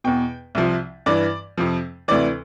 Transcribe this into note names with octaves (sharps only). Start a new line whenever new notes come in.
E2 B2 G5
C2 C3 F3
G2 E3 D5
F2 C3 F3
D2 C3 E3 D5